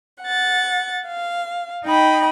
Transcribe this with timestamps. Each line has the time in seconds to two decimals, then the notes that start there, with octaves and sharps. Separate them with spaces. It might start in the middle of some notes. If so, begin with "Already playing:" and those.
0.23 F#5 A6
1.07 F5
1.84 D#4 D#5 G5 B5